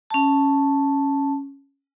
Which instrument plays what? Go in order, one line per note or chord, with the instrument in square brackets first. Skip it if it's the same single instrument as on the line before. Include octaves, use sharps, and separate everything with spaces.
[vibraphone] C#4 A5